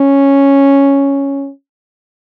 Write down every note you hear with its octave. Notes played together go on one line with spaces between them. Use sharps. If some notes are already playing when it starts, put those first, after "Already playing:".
Already playing: C#4